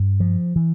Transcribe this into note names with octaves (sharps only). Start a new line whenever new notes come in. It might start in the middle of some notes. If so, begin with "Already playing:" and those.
Already playing: G2
F3
E3